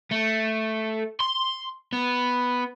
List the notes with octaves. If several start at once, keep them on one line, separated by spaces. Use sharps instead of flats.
A3
C6
B3